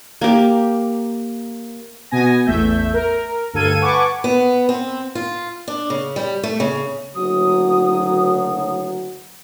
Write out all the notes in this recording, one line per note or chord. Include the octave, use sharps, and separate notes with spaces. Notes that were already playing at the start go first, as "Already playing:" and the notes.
A#3 G4
B2 B3 G#5 A#6
A1 E2 A3 E5 G6
A#4
D2 G2 A4 F5 G#6 D#7
B4 F#5 G#5 A5 C#6 D6
B3
C4
F4
D4
C#3
G3
A3
C#3
F#1 D2 F#3 D#6